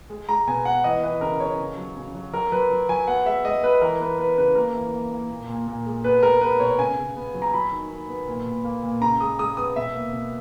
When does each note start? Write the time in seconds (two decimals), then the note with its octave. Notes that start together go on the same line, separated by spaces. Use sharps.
0.10 G#3
0.29 G#3 A#5
0.47 B2 G#5
0.65 B3 F#5
0.84 E3 D#5
1.03 E3 B4
1.21 C#3 A#4
1.40 C#3 C#5
1.59 C#3
1.77 F#3
1.96 C#3
2.14 F#3
2.33 F#3 A#4
2.52 F#3 B4
2.70 F#3
2.89 F#3 G#5
3.07 B3 F#5
3.25 G#3 E5
3.45 G#3 D#5
3.63 B3 B4
3.81 E3 A#4
4.00 B3 B4
4.18 B3 B4
4.38 C#3 B4
4.55 A#3 A#4
4.75 E3
4.93 A#3
5.12 A#3
5.30 A#2
5.49 A#2
5.67 A#2
5.86 G#3
6.04 B3 B4
6.23 G#3 A#4
6.41 B3 B4
6.60 B2 C#5
6.78 C#3 G#5
6.97 C#3
7.16 B3
7.34 F#3
7.42 A#5
7.53 F#3 B5
7.72 D#3
7.90 D#3
8.09 B3
8.27 A#2
8.46 A#2
8.64 A#3
8.83 A#2
9.01 C#3 A#5
9.20 G#3 D#6
9.39 G#3 D#6
9.57 B3 D#6
9.76 B2 E5
9.94 A#3
10.13 B2